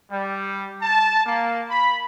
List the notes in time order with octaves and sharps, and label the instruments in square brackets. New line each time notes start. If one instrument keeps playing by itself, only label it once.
[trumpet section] G3
A5
A#3
B5